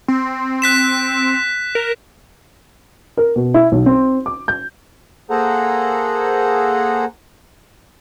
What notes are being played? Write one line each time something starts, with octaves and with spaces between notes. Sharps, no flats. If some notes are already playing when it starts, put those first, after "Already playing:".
C4
F#6 B6 E7
A#4
A#4
B2
E4
B1
C4
D6
G6
A#3 G#4 A4 C5 F#5 A#5